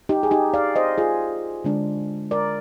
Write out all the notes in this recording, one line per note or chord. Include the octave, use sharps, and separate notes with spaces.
D#4 G4
G#4
D#4 G4
D5 F5
C5 D#5
F4 G#4
D3 G#3 D4
A#4 D5